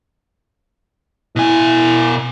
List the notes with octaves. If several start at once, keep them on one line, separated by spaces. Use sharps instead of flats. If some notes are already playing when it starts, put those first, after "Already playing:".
B2 E4 G#5